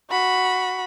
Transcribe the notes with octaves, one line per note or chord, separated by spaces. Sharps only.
F#4 B5